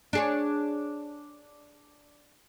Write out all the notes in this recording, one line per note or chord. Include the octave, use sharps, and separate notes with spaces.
D4 G#4 C#5